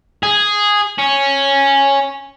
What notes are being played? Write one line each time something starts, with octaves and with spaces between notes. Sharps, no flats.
G#4
C#4